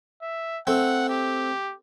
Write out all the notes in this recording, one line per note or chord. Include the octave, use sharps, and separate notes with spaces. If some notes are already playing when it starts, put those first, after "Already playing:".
E5
A3 C4 F#5
G4